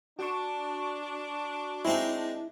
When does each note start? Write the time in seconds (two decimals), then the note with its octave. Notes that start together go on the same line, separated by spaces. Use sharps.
0.19 D4 F#4 C#6
1.85 G#3 C4 D#4 E4